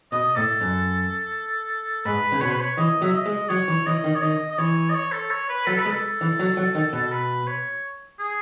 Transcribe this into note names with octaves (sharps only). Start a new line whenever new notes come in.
B2 D#5
A2 A4
F#2
G#2 B4
C#3
B2 C#5
B4
C#5
E3 D#5
F#3 E5
D#5
G#3
F#3 C#5
E3
E3 D#5
D#3
C#5
D#3 D#5
D#5
E3 C#5
D#5
C#5
A4
C#5
B4
F#3 A4
B4
G#3
A4
E3
F#3
F#3
D#3
B2
B4
C#5
G#4